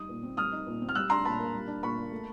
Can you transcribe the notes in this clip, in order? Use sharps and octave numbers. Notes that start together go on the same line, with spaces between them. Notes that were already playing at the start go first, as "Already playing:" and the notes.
Already playing: G3 D#4 D#6
A#2
C4
G3 D#6 F6
D#4
A#2
C4
F6
G3 E6 F#6
D4 A#5 C6
A#2 A5 B5
A#3
G3
D4
A#2 B5 C#6
A#3
A3